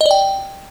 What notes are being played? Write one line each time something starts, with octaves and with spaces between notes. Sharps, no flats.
D#5
D5
G5